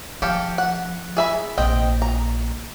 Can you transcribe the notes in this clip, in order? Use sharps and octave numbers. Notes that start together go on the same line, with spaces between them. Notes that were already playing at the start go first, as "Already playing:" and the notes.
F3 G4 A4 F5
F#5
G#4 E5 B5
A#1 C4 D#5 G5
A#5